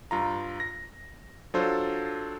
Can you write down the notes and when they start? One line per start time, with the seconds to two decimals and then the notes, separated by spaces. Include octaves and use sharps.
0.11 G2 F4 A#5
0.60 A#6
1.54 F#3 D4 F4 A4 C5